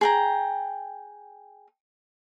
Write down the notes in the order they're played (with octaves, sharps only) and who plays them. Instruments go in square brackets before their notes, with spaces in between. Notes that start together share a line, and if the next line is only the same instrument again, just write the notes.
[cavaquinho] G#4 G5 A#5